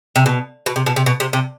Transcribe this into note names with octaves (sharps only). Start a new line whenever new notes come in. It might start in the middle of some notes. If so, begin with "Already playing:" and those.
C3
B2
B2
C3
B2
C3
B2
C3
C3